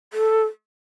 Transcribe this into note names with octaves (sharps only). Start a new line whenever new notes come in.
A4